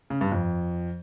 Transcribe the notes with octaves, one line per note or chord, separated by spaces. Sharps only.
C#3
G2
F2